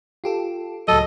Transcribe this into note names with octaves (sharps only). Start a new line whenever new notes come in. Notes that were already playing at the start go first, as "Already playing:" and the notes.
F4 G4 A4
C#2 A2 F#3 A4 D#5